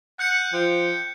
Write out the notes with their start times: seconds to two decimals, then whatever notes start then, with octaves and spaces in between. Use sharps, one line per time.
0.19 F#5 F#6 G6 C#7
0.53 F3 G5